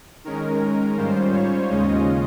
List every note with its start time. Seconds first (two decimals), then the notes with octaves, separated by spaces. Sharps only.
0.24 D#3 G#3 C#4 A#4
0.61 A#4
0.97 G#2 G3 C#4 F4 C5
1.34 C#5
1.70 D#2 C#3 G#3 C#4 F4 D#5